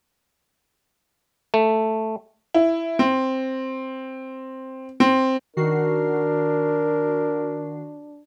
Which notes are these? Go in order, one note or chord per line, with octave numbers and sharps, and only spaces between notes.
A3
E4
C4
C4
D#3 D4 F#4 A#4 C7